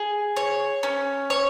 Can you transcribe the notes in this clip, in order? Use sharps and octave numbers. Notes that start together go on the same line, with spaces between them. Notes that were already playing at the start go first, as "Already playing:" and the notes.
Already playing: G#4
C#5
C#4
C#5